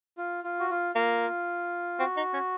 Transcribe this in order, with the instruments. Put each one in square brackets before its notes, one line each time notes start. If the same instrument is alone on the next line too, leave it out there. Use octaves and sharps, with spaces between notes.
[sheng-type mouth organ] F4
F4
F#4
F4
[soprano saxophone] A#3 [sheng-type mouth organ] F4
[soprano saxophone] C4 [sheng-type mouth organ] F#4
[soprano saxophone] D#4
C#4